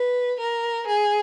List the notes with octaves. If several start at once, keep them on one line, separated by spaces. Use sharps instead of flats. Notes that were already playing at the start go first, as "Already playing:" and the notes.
Already playing: B4
A#4
G#4